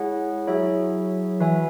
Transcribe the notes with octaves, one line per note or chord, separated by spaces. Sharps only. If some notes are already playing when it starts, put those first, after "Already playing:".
Already playing: G#3 E4 G#4 C#5 F#5
F#3 E4 G#4 C#5 E5
E3 F#4 B4 E5 G#5